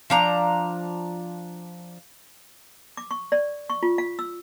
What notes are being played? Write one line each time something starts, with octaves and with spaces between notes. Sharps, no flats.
F3 D4 A#5
D6
C#6
D5
C#6
F4
F5
E6